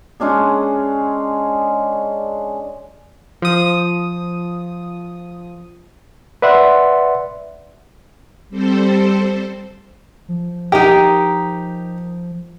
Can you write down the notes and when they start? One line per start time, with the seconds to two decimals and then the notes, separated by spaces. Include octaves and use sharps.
0.20 G#3 C#4 D4 G#4
3.42 F3 D#6
6.42 B4 D5 E5 F#5 C6
8.49 G3 C4 A4 C5
10.29 F3
10.72 D#4 G4 A#4